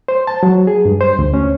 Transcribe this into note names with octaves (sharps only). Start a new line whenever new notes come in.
C5
A5
F#3
G#4
G2
C5
D2
C#4